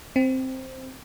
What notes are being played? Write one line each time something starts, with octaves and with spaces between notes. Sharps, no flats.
C4